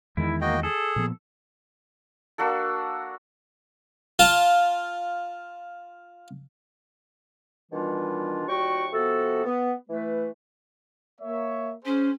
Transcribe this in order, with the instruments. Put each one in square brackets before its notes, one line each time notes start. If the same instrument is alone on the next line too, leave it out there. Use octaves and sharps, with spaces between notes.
[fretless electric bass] E2 D#3 G#3 [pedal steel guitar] E4
[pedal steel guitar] A#3 [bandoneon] F#4 D#5 G5
[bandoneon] G#4 [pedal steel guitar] A4
[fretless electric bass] A#2 F3 B3
[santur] A#3 D4 F#4 A4
[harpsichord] F4 A5
[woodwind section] B2 D#3 E3 G3 D4 F4
D#2 G3 F4 F#4 G5 C#6
C3 F3 B3 F#4 A4
B3
E3 A3 B4
[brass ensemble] A#3 C#5 E5
[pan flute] C#4 [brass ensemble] G#4 C5